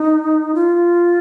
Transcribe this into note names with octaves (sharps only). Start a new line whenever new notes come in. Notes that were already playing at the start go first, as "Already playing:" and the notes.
Already playing: D#4
F4